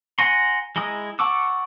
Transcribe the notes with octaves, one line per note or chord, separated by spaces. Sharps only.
F#5 G#5 A#5 C6
G#3 E4 A#5 D#6
F#5 A5 C#6 D6 E6